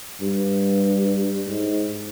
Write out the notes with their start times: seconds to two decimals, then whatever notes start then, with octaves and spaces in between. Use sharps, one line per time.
0.21 G2
1.48 G#2